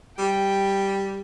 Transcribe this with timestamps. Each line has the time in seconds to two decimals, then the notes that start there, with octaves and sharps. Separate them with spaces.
0.18 G3 G5